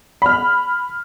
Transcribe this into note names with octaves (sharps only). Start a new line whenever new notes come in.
B5 F6